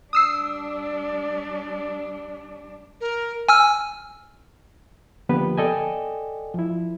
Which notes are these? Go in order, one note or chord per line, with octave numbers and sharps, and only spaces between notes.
G3 D4 D#6 E6 C7
A#4
G#5 E6 F6
D3 F3 A#3 B3 G4 B4
A4 D5 D#5 G5 G#5
F3 E4